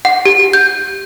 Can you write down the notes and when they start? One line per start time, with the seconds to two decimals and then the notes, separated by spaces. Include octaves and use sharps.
0.05 F#5
0.25 G4
0.53 G6